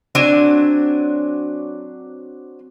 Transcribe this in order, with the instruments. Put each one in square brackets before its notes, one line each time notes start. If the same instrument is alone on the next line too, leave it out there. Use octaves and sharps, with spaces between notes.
[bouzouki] F#3 C4 D4 G#5